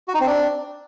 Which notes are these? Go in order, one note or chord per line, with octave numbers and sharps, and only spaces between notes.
F#4
D#4
C4
D4